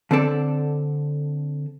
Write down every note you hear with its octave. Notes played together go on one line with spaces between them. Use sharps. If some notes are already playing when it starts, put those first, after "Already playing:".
D3 C4 D4 A4 D5